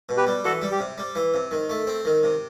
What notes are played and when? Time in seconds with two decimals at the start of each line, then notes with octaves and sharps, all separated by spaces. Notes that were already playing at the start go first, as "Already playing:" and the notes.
0.09 B2
0.17 G4 B4
0.27 G3
0.44 E3 F#4 A4
0.62 G3
0.71 G4
0.80 C3
0.98 G3
1.15 E3
1.34 C3
1.51 D#3
1.69 A3
1.87 C4
2.05 D#3
2.23 C3